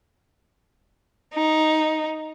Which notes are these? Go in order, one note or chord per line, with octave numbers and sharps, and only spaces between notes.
D#4